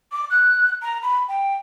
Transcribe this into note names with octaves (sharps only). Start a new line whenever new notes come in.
D6
F#6
A#5
B5
G5